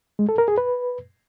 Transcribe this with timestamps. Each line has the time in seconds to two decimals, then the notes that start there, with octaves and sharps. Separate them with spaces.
0.19 G#3
0.29 A4
0.38 A#4
0.48 G#4
0.58 B4